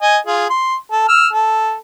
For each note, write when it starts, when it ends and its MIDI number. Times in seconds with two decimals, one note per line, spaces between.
0.01 0.18 75
0.01 0.18 80
0.26 0.45 65
0.26 0.45 68
0.50 0.75 84
0.92 1.06 69
1.08 1.28 88
1.08 1.28 89
1.33 1.75 69